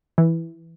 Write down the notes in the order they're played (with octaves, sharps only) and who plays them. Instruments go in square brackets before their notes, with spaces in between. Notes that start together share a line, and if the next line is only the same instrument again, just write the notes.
[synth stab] E3